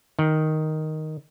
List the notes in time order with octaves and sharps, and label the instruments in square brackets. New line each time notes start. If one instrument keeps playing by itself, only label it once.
[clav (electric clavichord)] D#3